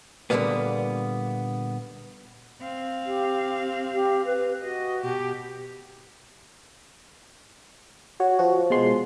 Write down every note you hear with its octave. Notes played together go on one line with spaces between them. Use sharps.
A#2 D3 E3 G3 A#3 B3
C4 F5
G4
G4
B4
F#4 D#5
B2 G4
F#4 C#5
F3 F#4
F3
B2 G#3 C6